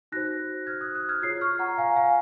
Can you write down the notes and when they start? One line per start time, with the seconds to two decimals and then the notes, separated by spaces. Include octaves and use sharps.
0.12 D#4 F#4 C5 F#6 A#6
0.67 F6 G#6
0.81 D#6 F#6
0.95 D#6 F#6
1.09 F6 G#6
1.22 F4 G#4 C#5 G#6 C7
1.41 C#6 F6
1.59 F#5 A#5
1.78 F5 G#5
1.96 F5 G#5